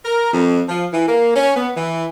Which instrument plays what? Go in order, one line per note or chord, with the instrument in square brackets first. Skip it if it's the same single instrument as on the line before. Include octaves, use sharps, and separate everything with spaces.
[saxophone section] A#4
F2
F3
E3
A#3
C#4
B3
E3